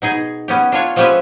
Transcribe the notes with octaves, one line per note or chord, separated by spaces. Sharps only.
B2 D#4 G#4
B3 C#4 G4
D4 F4 C#5
F3 G#3 C#4 G4 B4 E5